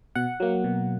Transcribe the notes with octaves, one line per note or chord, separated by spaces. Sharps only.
B2 F#5
F#3 A#3
B2